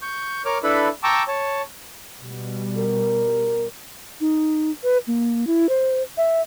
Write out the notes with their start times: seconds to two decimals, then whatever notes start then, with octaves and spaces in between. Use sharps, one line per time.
0.02 C#6 G6
0.45 A#4 C#5 D6 F6
0.63 D4 E4 A4 B4 B5
1.03 G5 A5 A#5 C#6 D6 E6
1.28 C#5 A5
2.21 B2 G3
2.77 A#4
4.21 D#4
4.83 B4
5.07 A#3
5.47 E4
5.69 C5
6.17 E5